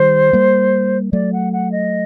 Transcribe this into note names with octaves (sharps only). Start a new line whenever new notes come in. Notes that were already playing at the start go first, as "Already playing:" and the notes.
Already playing: D#3 G3 C5
G3 A#3
F#3 A3 D5
F#5
F#5
D#5